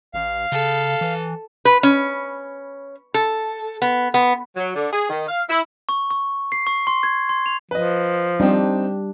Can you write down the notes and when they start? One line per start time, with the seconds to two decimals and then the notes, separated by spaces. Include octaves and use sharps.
0.14 A1 F5
0.52 C#3 A4
1.01 E3
1.65 B4
1.83 C#4
3.14 A4
3.82 B3
4.14 B3
4.56 F#3
4.75 D3
4.93 G#4
5.10 D#3
5.28 F5
5.49 E4
5.89 C#6
6.11 C#6
6.52 C7
6.67 C#6
6.87 C6
7.03 G#6
7.29 C6
7.46 F7
7.71 F3 B4 D#5
8.40 G3 C4 D4 D#4 G4